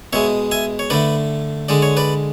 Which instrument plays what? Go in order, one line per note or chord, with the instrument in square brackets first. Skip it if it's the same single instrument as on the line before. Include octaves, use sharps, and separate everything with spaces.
[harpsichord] B2 G#3 C#5 E5
E5 G#5
C#5
D3 A3 B4 D5
D3 G#3 D5
C#5
B4 D5